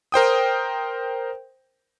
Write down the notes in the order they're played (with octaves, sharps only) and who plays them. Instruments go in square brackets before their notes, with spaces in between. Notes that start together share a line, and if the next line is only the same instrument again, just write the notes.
[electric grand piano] A#4 C5 G5 D#6